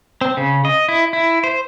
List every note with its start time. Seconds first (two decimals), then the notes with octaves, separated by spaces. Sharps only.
0.21 C4
0.37 C#3
0.65 D#5
0.89 E4
1.13 E4
1.44 C5